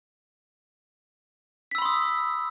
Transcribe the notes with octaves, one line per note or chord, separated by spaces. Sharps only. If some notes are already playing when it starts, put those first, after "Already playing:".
B5 C6 D#6 E6 B6